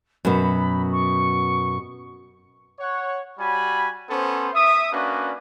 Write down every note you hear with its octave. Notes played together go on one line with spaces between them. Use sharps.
F#2 B2 B5
C#6
C#5 F#5
G3 F#4 G#5 B5
B3 C#4 A4 C5
E5 D#6
A#3 C#4 D4 F#4 B4 D5